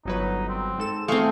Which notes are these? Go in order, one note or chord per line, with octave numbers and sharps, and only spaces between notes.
G1 F#3 D#4 B4
C4
G#2 A4 E7
A3 C4 G#4 F5 C6 C#6